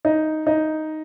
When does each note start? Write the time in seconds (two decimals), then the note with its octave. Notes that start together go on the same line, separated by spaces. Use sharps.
0.05 D#4
0.47 D#4